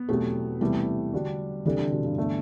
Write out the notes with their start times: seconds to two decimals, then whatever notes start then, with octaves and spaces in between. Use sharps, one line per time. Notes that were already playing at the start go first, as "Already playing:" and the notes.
Already playing: B3
0.09 E2 B2 F#3 A3 C4 G4
0.61 E2 C3 E3 G3 A3
1.13 D3 G3 D4 F#4
1.65 C3 E3 G3 D4 A4
1.78 D3
1.92 B2
2.04 G2
2.18 B2 A3 D4